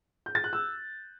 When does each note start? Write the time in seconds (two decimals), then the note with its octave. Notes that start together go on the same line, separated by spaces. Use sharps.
0.26 G6
0.35 A6
0.44 F#6
0.53 E6